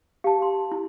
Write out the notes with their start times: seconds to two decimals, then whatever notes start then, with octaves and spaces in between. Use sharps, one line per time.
0.24 G4 F5 A5
0.42 C6
0.72 E4